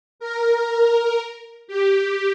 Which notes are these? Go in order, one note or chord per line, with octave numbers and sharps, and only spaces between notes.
A#4
G4